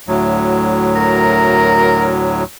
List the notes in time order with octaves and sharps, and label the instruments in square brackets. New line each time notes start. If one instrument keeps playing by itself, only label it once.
[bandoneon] D2 A2 F#3
[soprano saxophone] A#4